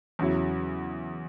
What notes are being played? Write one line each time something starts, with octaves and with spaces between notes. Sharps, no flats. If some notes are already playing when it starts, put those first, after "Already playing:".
E2 C#3 F#3 E4